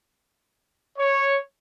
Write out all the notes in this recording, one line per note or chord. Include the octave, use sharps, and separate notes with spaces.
C#5